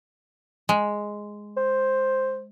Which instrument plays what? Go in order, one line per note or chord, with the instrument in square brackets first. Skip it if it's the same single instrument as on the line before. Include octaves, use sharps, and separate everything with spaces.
[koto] G#3
[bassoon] C5